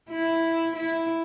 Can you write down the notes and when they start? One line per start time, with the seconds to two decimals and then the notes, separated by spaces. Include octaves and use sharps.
0.10 E4
0.76 E4